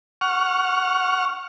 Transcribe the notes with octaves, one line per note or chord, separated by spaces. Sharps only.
F#5 C#6 F6